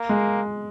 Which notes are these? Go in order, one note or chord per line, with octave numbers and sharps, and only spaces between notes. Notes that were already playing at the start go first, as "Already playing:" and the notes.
Already playing: A#3
G#3